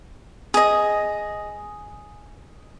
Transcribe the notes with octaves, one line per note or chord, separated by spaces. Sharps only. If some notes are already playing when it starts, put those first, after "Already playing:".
G#4 D#5